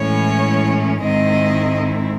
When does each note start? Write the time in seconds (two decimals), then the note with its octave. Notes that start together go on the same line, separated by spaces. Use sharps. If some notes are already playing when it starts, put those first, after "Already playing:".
Already playing: A2 E3 G#3 C#4 C#5
1.01 G#2 D#3 G#3 C4 E4 D#5